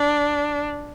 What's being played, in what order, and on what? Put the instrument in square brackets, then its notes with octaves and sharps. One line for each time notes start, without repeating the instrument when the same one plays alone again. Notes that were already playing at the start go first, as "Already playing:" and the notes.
Already playing: [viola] D4